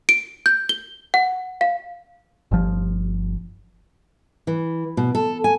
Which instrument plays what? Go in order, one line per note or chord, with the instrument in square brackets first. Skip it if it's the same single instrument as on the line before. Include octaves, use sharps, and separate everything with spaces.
[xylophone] D7
G6
G7
F#5
F5
[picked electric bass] G1 F3
[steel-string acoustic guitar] E3
B2
A4
G#5